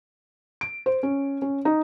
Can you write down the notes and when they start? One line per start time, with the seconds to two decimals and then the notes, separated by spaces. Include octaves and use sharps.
0.61 D7
0.86 C5
1.03 C#4
1.42 C#4
1.65 D#4